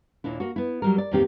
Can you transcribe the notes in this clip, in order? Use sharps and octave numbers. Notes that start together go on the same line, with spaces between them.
D#2 A#2 D4 E4
A#3 F#4
B3 E4
F#3 G3 A#4
D5
E2 A2 D#3 A#3 C4 G4